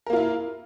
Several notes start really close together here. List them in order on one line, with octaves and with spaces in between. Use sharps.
A#4 A#3 F4 E4